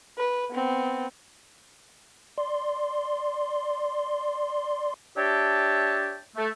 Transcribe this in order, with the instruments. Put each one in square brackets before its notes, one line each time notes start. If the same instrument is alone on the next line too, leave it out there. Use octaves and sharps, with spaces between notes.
[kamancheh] B4
B3 C4
[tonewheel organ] D5 C6
[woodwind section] D4 G4 C#5 E5 G5 A5
A3